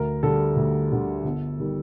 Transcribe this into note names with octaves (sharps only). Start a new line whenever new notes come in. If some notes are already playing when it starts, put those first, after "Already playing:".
Already playing: D2 A#4
D3 G3 A4
D2
D3 G3
G1
D#3 G3